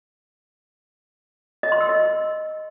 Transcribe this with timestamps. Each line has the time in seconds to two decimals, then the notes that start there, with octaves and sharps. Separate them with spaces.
1.63 D#5
1.72 C6
1.81 E6
1.89 D#5